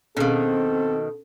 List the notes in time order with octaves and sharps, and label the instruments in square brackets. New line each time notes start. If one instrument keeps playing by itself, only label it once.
[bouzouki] B2 D#3 [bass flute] C4 [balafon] C#4 G#4 F5 [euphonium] A4